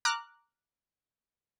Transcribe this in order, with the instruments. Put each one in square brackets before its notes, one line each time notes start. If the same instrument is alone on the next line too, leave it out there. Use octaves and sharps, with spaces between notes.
[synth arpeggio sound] A#5 D6 F6 F#6